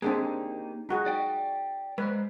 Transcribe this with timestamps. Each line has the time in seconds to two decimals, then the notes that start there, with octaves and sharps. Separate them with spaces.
0.02 A#3 C4 D4 D#4 G4 G#4
0.89 D#4 F#4 G#4
1.06 D5 G5
1.98 G#3 B4 C5